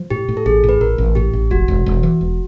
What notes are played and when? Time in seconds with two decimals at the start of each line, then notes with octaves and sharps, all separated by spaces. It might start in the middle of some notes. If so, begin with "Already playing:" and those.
Already playing: F3
0.10 A2 G4
0.28 A2
0.37 A4
0.46 A1 G#4
0.64 A2
0.69 B4
0.81 A1 A#4
0.98 A1
1.15 A2 G4
1.33 A1
1.51 E1 F#4
1.68 E1
1.86 E1
2.03 E3
2.21 E1